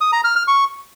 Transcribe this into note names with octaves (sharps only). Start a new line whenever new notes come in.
D#6
A#5
F6
F6
C#6